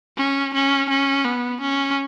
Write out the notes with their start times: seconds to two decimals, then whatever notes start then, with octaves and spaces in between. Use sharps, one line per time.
0.17 C#4
0.54 C#4
0.89 C#4
1.24 B3
1.61 C#4